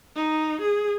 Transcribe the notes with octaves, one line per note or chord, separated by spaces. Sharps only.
D#4
G#4